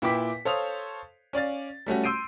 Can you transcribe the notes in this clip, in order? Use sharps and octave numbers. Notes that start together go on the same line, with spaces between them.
A#2 E4 B4 G5 D6 B6
A4 C5 C#5 F5 D#6 F7
C#4 D5 F5 A6
G3 A3 C#4 F#4
C6 E6 G6 C7 D7 D#7